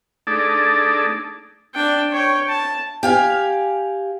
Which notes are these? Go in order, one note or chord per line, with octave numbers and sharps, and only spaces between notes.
A3 D4 D#4 G#4 A4 D5
D4 G5
C#5 G5
A5
G4 F5 G#5